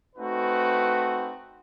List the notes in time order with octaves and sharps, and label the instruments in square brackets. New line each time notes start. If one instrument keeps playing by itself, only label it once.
[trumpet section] A3 C4 D#4 F#4 B4